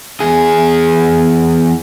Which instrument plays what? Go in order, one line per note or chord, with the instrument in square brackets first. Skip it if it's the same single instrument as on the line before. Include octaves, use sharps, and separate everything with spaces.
[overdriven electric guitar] E2 G#4